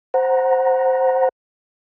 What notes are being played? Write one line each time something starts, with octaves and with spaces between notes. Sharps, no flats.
C5 F#5 A#5